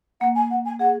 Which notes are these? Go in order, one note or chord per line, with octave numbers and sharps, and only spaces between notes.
A#3 F#5
G#5
F#5
G#5
G#4 F#5